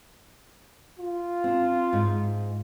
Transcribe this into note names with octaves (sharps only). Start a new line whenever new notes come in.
F4
C4 D4
G#2